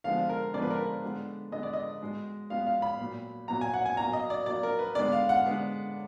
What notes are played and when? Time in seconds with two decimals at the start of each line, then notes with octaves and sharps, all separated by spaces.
0.04 D3 F3 G#3 B3 F5
0.30 A#4
0.54 D3 F3 G#3 B3 D5
0.62 B4
0.70 A#4
0.79 B4
1.03 D3 G#3 B3
1.52 D3 G#3 B3 D#5
1.63 D5
1.73 D#5
2.01 B2 G#3 B3
2.50 B2 G#3 B3 F5
2.67 F5
2.82 B5
2.99 A#2 F#3 B3
3.48 A#2 F#3 B3 A#5
3.61 G#5
3.74 F#5
3.86 G#5
3.97 B2 F#3 A#3 A#5
4.13 D#5
4.30 D5
4.46 B2 F#3 A#3 D5
4.63 A#4
4.79 B4
4.95 D3 G#3 B3 D5
5.12 F5
5.29 F#5
5.45 D3 G#3 B3